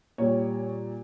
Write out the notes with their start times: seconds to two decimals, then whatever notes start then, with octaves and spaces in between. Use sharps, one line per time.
0.18 A#2 G3 C#5